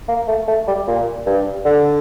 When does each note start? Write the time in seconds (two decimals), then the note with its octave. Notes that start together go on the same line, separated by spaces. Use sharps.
0.08 A#3
0.27 A3
0.48 A3
0.67 G3
0.87 A#2
1.27 G2
1.65 D3